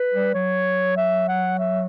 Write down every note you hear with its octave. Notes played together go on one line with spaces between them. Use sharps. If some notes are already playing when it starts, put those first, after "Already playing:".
Already playing: B4
G3
F#3 C#5
E5
F#5
E5